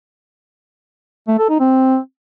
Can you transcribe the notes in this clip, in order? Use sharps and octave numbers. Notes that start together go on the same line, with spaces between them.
A3
A4
D#4
C4